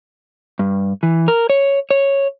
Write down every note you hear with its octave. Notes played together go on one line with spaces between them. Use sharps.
G2
E3
A#4
C#5
C#5